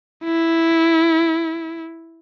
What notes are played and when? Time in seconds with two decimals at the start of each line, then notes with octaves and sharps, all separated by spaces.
0.24 E4